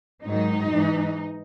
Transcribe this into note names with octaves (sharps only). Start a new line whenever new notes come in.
G#2 D#3 F#3 D#4
G#2 E3